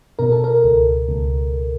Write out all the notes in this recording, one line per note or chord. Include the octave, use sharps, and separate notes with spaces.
B2 A#4
A4
A#4
C#2
C#2